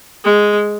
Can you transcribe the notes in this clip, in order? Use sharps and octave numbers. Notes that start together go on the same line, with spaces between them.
G#3